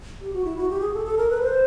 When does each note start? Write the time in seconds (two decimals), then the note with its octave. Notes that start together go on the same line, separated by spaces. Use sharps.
0.21 G4
0.33 F#4
0.45 E4
0.57 F#4
0.69 G4
0.81 G#4
0.94 A4
1.05 A4
1.18 A#4
1.29 B4
1.42 C5